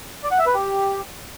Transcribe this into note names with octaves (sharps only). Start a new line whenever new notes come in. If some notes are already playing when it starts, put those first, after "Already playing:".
D5
F#5
E5
B4
G4